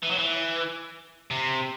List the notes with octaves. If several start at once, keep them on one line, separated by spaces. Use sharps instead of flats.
E3
F#3
E3
C3